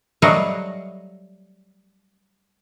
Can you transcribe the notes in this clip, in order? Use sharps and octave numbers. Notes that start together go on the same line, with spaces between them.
F#3 G3 A3 D#5 F5 F#5